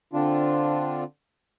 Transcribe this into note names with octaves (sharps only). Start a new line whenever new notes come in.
D3 C4 D4 F4